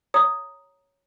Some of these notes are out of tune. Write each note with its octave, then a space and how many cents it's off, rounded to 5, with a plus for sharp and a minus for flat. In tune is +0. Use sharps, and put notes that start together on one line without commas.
C#5 +0 A#5 +0 D#6 +5